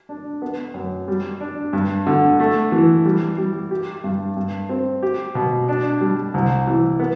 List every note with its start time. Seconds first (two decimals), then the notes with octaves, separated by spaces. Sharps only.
0.09 D4
0.42 B3
0.74 F#2
1.08 G3
1.40 D4
1.73 G2
2.07 D3
2.40 A3
2.72 E3
3.06 G3
3.38 G3
3.71 G4
4.04 G2
4.37 G2
4.69 C4
5.03 G4
5.35 B2
5.68 D4
6.01 G3
6.34 C2
6.67 E3
6.99 B3